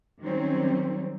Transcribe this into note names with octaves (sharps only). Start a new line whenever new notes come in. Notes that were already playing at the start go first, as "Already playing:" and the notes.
D#3 F#3 G3 C4 C#4